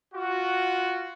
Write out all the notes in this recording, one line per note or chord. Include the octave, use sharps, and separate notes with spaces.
F4 F#4